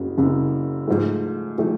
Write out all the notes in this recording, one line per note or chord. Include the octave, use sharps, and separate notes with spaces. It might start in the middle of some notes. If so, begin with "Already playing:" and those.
Already playing: F#1 F#2 C#3 F#3
F#1 F#2 C#3 F#3
G#2 F3 A3
F3 A3